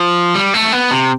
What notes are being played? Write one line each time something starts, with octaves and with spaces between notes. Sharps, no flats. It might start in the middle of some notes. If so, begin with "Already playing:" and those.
Already playing: F3
G3
A3
B3
C3